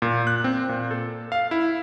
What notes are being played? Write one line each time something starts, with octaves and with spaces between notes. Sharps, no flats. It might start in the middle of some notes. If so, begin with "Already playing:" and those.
A#2
F#6
C4
A#2
A4
F5
E4